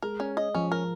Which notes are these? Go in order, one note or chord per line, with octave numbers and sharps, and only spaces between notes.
G#3 A#4
C#4
D#5
F3 C#4
A#4